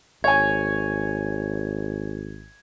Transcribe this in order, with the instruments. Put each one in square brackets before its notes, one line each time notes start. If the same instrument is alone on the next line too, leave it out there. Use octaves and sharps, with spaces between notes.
[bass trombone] G#1 [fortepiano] C#5 G#5 [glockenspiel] G#6